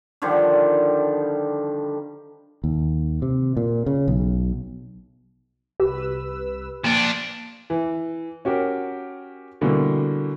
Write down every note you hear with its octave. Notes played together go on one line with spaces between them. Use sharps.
D3 D#3 F3 G3
D#2
C3
A#2
C#3
B1
C2 G4 B4 E6
F3 A#3 D4
E3
C#4 F#4 G4 A#4
B2 D3 E3 G3 A#3